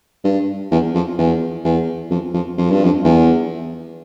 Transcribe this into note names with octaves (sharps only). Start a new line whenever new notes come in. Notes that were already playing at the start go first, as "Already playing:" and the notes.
G2
E2
F2
E2
E2
F2
F2
F2
G2
F2
E2